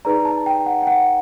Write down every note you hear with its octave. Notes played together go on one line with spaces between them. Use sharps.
D#4 G#4 B4 D5 A#5
A5
G5
F#5
G5
F#5